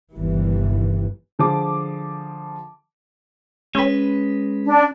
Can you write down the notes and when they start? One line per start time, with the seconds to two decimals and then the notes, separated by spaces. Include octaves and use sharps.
0.13 G1 D#2 C3 E3 G3
1.39 D3 F3 G#4 D6
3.75 G#3 C#4 B4
4.65 D4